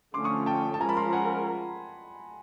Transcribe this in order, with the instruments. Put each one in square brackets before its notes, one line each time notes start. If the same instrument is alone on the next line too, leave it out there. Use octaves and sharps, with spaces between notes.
[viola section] D3 F3 A3 C#4 [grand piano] C6 D6
[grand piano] C#6 D#6
G5 A5
A5
[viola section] F3 G#3 C#4 F4 A#4 [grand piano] G#5 A#5
[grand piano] A5 B5
A#5 C6
F#5 G#5